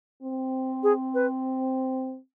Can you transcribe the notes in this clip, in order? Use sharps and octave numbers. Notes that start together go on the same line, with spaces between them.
C4
G#4
B4